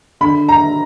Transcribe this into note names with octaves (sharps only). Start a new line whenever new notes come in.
D3 B5
A#5